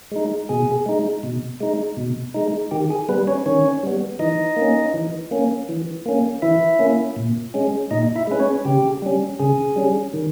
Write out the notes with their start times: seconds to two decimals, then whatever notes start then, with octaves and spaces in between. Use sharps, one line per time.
0.11 G#3 D#4
0.49 B2 G#4
0.86 G#3 D#4
1.23 B2
1.60 G#3 D#4
1.97 B2
2.34 G#3 D#4
2.71 D#3 G4
2.90 G#4
3.09 G3 B3 B4
3.27 C#4 C#5
3.46 D#3 C#4 C#5
3.83 G3 B3
4.19 E3 D#4 D#5
4.56 A#3
4.62 C#4
4.94 E3
5.31 A#3 C#4
5.69 E3
6.06 A#3 C#4
6.42 E3 E4 E5
6.79 A#3 C#4
7.16 A#2
7.54 G#3 C#4
7.91 A#2 D#4 D#5
8.16 E4 E5
8.27 G#3 C#4 B4
8.40 C#4 C#5
8.65 C#3 G4
9.02 G3 C#4
9.39 C#3 G#4
9.76 G3 C#4
10.13 D#3